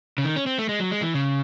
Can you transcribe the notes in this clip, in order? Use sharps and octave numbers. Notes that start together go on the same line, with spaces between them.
C#3
D#3
C#4
C4
A3
G#3
F#3
G#3
E3
C#3